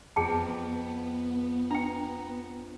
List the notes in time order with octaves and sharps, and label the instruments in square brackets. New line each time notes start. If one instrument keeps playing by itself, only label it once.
[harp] F2 [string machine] B3 [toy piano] G#4 G5 A5
[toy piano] D4 G5 [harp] A#5